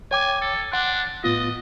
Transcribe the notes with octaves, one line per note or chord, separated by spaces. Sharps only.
C#5 G5 G#5 D6
A4
D4 F#5 C6 F#6
A2 B3 F4 D#5